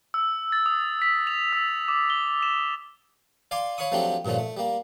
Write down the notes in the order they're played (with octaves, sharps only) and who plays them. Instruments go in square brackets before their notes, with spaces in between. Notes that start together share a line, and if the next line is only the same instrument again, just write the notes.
[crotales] E6
A6
D#6
B6
F7
E6
D6
G7
E7
[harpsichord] D5 F5 G#5 C6 D6
C#5 F5 B5 C#6 D#6
F3 F#3 A3 C4 D4 G4
G2 A#2 D3 F3 C#4
A3
G3 A#3